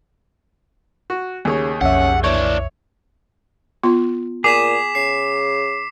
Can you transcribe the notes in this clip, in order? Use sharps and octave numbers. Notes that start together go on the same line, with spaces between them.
F#4
D#2 C#3 G#4 C#5
B1 F2 C#4 E5 F#5
A#2 E3 D4 C#5
B3 F4 C6
A#2 G#4 D6 B6 E7
C#3 C7